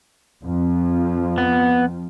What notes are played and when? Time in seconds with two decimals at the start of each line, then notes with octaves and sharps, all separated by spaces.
0.44 F2 F3
1.38 B3